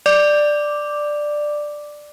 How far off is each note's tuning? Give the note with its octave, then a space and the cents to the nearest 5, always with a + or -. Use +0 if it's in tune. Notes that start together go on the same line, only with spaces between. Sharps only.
D5 +10 D6 +0